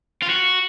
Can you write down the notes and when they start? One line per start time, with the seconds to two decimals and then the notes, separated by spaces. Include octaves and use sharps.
0.23 F4
0.30 F#4